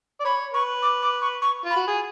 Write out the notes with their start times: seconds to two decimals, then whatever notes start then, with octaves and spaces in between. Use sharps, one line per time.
0.20 D5
0.25 C#5 B5
0.53 B4 C#6
0.82 D6
1.02 D6
1.21 C#6
1.41 C#6
1.65 F4
1.70 B5
1.76 F#4
1.87 G#4